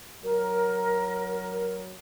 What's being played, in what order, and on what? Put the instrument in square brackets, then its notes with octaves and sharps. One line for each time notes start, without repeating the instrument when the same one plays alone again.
[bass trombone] F#3 [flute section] A#4